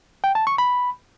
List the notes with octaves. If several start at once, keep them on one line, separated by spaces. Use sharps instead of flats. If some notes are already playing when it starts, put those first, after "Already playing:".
G5
A5
C#6
B5